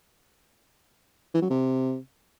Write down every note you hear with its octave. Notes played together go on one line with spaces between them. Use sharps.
E3
F#3
C3